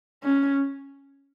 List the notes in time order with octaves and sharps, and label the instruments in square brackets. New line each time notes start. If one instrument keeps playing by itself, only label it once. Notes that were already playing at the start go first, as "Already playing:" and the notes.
[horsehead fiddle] C#4